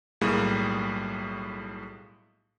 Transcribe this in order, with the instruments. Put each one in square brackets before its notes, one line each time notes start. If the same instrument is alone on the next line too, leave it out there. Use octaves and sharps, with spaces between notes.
[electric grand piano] B1 A2 G3 A#3 G#4